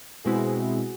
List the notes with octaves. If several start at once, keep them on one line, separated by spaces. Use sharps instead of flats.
B2 G#3 C4 E4 F#4 G#4